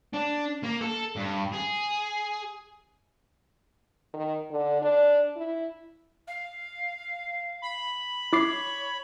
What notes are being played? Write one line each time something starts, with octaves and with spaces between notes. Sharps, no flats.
D4
A#3
A4
G2
G#4
D#3
D3
D4
E4
F5
B5
E4 C#5 D6 C7